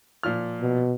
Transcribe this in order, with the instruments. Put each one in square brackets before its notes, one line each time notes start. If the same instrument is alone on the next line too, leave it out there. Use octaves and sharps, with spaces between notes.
[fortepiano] A#2 F3 F6
[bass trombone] B2